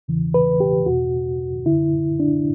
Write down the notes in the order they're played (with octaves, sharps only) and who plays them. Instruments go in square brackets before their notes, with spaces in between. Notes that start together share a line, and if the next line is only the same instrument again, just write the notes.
[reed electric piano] E2 C#3 E3
B4
G4
E2 B2 F#4
F#2 D3 E4
D4